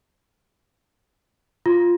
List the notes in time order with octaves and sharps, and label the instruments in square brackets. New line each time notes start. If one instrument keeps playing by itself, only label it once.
[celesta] F4